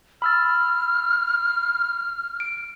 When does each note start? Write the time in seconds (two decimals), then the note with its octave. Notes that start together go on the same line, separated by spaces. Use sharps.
0.22 B5 E6 F6 A6
2.40 D7